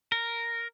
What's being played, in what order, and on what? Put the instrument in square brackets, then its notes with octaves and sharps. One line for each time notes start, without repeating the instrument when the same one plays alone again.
[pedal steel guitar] A#4